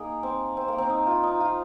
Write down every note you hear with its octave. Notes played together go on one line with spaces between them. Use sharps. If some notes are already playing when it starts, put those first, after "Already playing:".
Already playing: A#3 D#4 G#4
C4
C4
A#3
C4
D#4
F4
D#4
F4